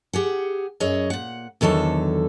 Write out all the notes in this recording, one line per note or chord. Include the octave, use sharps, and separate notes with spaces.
G4 G#4 F#5
F#2 G#4 C#5 D#5
A#2 F#5
E2 D3 D#3 F#3 A4